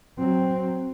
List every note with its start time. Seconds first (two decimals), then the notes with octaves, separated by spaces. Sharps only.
0.18 F#3 C4